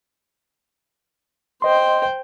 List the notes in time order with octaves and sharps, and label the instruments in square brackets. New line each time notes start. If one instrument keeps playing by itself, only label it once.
[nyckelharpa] C5 G5 [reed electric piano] D#5 C6